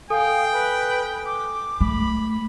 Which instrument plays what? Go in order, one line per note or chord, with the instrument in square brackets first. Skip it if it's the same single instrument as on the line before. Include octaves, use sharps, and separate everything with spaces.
[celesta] A4 G#5 D#6 [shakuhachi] F5 [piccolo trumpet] G5
[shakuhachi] B4
D6
[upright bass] A3 [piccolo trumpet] B5